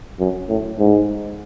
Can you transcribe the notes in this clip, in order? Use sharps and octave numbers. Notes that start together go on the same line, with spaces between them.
F#2
A2
G#2